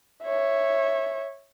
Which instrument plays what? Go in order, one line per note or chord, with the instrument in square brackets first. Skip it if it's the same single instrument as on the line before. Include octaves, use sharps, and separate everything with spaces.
[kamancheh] C#5 E5